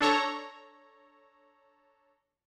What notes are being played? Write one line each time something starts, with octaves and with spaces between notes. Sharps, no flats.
D4 A4 C#5 A#5